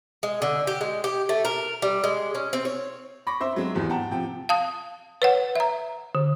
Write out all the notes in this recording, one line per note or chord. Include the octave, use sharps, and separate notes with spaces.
G#3
D3
G4
G#3
G4
A3
A#4
G3
G#3
C#4
C4
C#5
B5 C#6 D6 A#6
C4 C5 E5 C6
F#3 G#3 C4
G#1 E2 G4
F#5 G5 A5 A#5
C3 F3 G5
F5 A5 D#6
B4 C#5 F#5
E5 A#5
D3